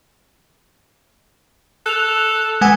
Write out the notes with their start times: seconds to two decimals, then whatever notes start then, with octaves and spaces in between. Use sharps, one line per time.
1.86 A4 F#6 E7 F7
2.61 G#3 B3 F#5 G#5